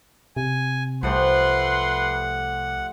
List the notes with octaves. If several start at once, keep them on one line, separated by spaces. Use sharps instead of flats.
C3 G#5
C2 F3 A3 G4 B4 F#5 C6